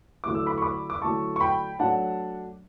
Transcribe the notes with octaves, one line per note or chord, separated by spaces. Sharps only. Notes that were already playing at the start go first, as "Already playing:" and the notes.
D3 F#3 A3 E4 D6
E6
B5 D6
C#6
B5 D6
D6
D3 F#3 A3 E4 A5 C#6
C#6
G5 B5
F#3 A3 D4 F#5 A5